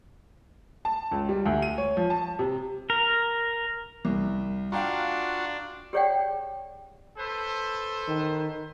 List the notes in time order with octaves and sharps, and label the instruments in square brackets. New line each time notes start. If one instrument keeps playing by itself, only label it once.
[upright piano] A5
C#2
G3
D2
D#7
C#5
F3
A5
C3
[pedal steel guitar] A#4
[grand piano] C2
[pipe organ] D4 [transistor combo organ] F4 F#4 [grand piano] F5 G5 A#5
[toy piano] G4 G#4 C#5 D5 F#5 G5
[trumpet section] A4 B4 C5
[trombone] D#3